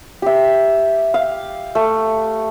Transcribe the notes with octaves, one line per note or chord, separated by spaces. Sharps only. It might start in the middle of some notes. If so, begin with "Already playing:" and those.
G4 E5
F5
A3